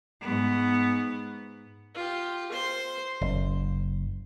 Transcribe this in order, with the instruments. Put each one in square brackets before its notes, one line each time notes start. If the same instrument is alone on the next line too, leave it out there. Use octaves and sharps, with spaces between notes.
[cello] G#2 B3
[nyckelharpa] F4 G4
C5 C6
[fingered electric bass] F#1